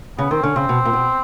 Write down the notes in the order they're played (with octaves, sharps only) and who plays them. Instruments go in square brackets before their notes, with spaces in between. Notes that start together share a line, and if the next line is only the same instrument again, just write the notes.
[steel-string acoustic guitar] C#3 [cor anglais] B3
[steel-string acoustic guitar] D#3 [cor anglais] C4
[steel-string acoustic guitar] D3 [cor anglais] C#4
[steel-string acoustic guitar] C#3 [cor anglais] C4
[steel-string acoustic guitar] B2
A#2
B2